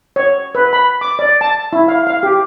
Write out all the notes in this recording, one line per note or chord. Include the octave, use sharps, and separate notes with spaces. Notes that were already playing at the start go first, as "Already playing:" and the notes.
C#5
B4
B5
D6
D5
A5
E4
F5
F5
G4